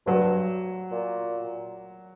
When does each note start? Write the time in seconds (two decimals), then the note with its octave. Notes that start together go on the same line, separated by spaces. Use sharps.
0.07 G2 F#3
0.92 A#2